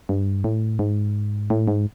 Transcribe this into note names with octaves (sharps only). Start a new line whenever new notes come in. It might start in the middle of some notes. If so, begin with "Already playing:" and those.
G2
A2
G#2
A2
G#2